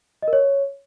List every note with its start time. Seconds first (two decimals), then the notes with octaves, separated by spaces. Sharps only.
0.22 D#5
0.28 A#4
0.33 C#5